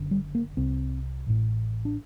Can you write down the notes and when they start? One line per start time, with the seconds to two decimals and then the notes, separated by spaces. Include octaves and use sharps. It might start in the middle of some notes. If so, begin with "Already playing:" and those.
Already playing: F#1 F#2 D3
0.11 G3
0.35 A#3
0.57 C2 C3 C4
1.27 A1 A2
1.85 D4